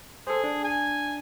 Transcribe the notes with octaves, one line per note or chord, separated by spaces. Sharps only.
G#4 A4 C5
D4
G#5